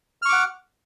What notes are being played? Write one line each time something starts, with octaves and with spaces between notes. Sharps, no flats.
F#5 C#6 D6 F6